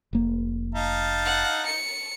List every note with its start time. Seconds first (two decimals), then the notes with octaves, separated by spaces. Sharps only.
0.13 F1 A#3
0.75 D#4 F5 A5
1.25 F#5
1.65 C#7